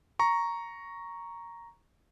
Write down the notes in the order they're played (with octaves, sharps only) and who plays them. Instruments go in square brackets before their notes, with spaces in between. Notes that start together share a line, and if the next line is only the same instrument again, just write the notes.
[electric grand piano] A#5 C#6